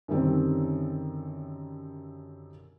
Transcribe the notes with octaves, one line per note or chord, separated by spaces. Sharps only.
F#2 D3 D#3 G3 C4